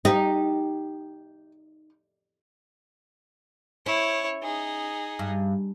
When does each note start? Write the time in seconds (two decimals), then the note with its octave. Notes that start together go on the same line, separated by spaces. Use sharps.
0.05 D#4 G4
3.86 C#4 E4 C#5
4.42 D#4 G#4
5.19 G2